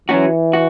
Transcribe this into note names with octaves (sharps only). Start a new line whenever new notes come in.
E3 F#3 C#4 F#4
F#4